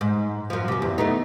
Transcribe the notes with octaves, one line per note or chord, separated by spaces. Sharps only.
G#2
F#2 F3
F#2 C3
E2
A3 B3 D#4